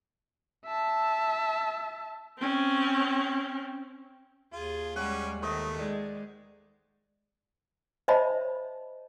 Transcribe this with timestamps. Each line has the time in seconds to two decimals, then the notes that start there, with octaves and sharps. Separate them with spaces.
0.66 E5 A5
2.39 C4 C#4
4.53 D#2 F4 G#4
4.96 G3 G#3 C#4 F#5
5.43 D#3 A3 C5 D#5
5.78 G#3 D5
8.08 C5 C#5 D#5 E5 A5 B5